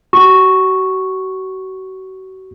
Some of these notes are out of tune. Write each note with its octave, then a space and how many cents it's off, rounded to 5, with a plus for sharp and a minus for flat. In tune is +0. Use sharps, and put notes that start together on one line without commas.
F#4 +40 C#6 +0